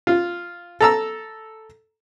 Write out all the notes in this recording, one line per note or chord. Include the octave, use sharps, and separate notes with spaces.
F4
A4 A#5 E6